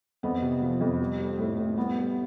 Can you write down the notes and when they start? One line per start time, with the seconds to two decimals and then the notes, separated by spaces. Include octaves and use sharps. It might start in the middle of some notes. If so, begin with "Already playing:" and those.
0.23 F2 B3
0.42 C3
0.62 F3
0.81 F2
1.00 G3
1.19 G3
1.38 A2
1.58 A2
1.76 G3 B3
1.97 G3